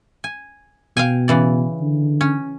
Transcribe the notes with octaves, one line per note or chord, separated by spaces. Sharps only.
G#5
B2 F5 G5 G#5
C#3 E3 D5
D3
C#4